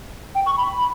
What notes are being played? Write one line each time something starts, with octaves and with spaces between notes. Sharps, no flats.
G5
C#6
B5